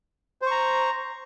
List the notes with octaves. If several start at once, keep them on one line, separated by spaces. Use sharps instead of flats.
C5 A#5 C#6